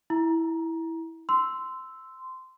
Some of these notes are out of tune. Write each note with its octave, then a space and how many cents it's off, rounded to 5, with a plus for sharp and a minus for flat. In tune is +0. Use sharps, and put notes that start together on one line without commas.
E4 -5 A#5 +20
C6 -15 E6 +0